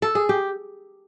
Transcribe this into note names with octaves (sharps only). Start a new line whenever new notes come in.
A4
G#4
G4